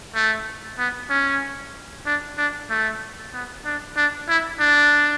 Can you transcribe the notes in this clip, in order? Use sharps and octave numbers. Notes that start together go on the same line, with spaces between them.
A3
B3
C#4
D4
D4
A3
B3
D4
D4
E4
D4